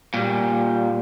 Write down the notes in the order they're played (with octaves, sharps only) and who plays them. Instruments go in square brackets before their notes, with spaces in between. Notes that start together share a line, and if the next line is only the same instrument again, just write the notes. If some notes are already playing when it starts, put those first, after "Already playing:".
[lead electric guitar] A#2 G3